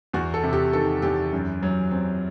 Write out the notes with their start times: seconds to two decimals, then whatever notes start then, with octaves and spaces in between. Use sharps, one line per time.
0.13 E2 F#4
0.34 A4
0.43 C3
0.53 G4
0.73 D#3 A4
1.02 E2 G4
1.33 F#2
1.63 F#3
1.91 C4